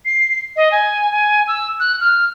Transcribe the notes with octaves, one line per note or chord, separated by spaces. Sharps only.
C7
D#5
G#5
G#5
E6
F#6
F6